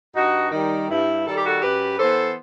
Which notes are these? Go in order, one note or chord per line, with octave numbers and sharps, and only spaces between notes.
G2 D#4 F#4
D#3 G3
G2 E4
D#3 G3 A4
G4
F#4 A4
F#2 G4 B4
E3 B3 A4 C5